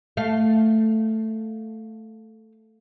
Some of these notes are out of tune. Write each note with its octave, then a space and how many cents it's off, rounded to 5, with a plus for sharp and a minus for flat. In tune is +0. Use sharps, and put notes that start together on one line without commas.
A3 +0 F5 +0